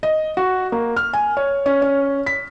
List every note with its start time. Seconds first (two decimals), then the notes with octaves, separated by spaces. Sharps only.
0.03 D#5
0.37 F#4
0.72 A#3
0.96 F6
1.13 G#5
1.37 C#5
1.66 C#4
1.82 C#4
2.26 B6